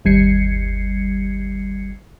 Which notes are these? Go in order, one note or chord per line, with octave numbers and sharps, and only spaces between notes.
G1 D#2 G3 G#6 C7 C#7